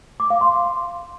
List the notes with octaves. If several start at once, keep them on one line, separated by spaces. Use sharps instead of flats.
D6
F5
C6